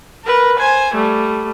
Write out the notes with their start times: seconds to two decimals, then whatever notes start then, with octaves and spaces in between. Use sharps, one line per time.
0.25 A#4 B4
0.59 C5 G#5
0.94 G3 A3